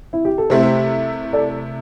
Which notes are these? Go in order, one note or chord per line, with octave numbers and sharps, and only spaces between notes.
E4
G4
A4
C3 A3 E4 G4 C5
A4 D5